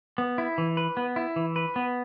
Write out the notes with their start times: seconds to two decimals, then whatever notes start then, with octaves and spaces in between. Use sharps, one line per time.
0.18 B3
0.38 E4
0.58 E3
0.77 B4
0.97 B3
1.16 E4
1.36 E3
1.56 B4
1.76 B3